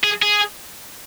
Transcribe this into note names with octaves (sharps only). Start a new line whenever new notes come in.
G#4
G#4